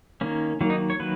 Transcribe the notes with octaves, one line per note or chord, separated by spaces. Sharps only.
D#3 A#3 C#4
D#3 F#3 A#3
D#4
C#5
D#3 F#3 A#3 B4